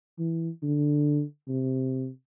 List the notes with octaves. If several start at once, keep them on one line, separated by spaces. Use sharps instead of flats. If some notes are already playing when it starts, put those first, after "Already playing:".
E3
D3
C3